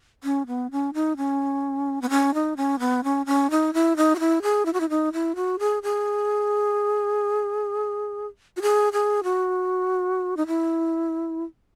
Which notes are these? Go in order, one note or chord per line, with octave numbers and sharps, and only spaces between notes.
C#4
B3
C#4
D#4
C#4
B3
C#4
D#4
C#4
B3
C#4
C#4
D#4
E4
D#4
F#4
E4
G#4
E4
F#4
E4
D#4
E4
F#4
G#4
G#4
F#4
G#4
G#4
F#4
D#4
E4